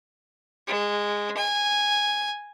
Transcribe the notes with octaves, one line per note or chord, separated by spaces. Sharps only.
G#3
G#5